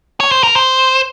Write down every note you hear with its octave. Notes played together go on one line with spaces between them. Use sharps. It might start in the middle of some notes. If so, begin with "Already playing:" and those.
C#5
C5
A#4
C5